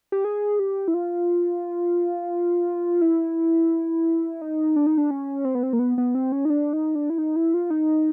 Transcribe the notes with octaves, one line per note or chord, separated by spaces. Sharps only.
G4
G#4
G4
E4
F4
E4
D#4
D4
D#4
D4
C#4
C4
B3
C4
A#3
B3
B3
C4
C#4
D#4
D4
D#4
D4
E4
D#4
E4
F4
D#4